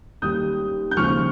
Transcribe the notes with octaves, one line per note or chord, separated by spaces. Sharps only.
D#2 D#3 G3 D#6 G6
G6
D#2 C#3 F3 C#6 F6